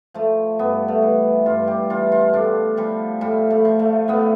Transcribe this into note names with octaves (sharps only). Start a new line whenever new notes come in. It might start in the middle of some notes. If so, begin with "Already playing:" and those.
F3 A3
G2 B3
A3
E3
G2 F4
G4
E3 F4
F4
A2 D4
F3 G3
A2 G3
A3
F3
A3
A2 B3